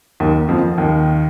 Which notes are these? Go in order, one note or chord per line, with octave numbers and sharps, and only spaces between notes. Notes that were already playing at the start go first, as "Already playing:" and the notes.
D#2 D#3
F2 F3
D#2 D#3